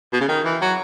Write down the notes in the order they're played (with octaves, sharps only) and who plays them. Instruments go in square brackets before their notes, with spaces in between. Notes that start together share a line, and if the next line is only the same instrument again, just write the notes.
[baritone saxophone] B2
C#3
D#3
E3
F#3